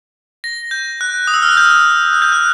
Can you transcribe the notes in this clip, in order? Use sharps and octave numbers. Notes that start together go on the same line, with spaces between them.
A#6
G6
F#6
D#6
E6
F6
F#6
G6
F#6
G6
F#6